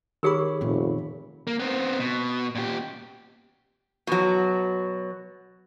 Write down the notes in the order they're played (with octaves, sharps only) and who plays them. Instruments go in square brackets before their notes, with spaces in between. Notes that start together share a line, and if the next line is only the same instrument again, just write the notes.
[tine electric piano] D#3 C#5 B5 [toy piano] G4 G#4 A#4
[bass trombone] F1 [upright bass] A#2 B3
[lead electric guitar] A#3
B3 C4
B2
A#2 G4
[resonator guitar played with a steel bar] B2 F#3